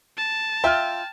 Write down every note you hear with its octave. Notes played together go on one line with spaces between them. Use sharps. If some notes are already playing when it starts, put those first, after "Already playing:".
A5
F4 E5 G5 F6